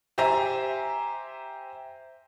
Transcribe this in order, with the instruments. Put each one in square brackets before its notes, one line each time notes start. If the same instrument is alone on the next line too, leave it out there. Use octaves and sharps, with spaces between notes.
[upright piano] G4 C5 E5 G#5 A#5